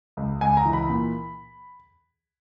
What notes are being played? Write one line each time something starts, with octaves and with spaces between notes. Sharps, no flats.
C#2
C#2 G#5
A#5
E3
B5
A#2